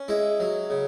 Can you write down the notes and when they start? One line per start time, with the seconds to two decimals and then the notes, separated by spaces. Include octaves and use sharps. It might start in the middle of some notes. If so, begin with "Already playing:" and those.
Already playing: C#4
0.08 G#3 E4
0.40 F#3
0.70 C#3